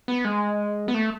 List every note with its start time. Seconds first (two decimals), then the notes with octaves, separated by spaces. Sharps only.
0.08 B3
0.25 G#3
0.88 B3
0.94 A3